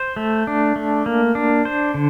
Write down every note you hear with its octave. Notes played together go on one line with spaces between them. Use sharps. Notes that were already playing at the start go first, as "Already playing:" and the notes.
Already playing: C5
A3
D4
A3
A#3
D4
C5
D3